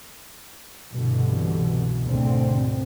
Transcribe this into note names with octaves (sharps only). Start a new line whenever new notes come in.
C2 G2 B2 D3 E3
D2 G#2 B2 D3 C4